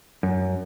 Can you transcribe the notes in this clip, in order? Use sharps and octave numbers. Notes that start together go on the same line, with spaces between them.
F#2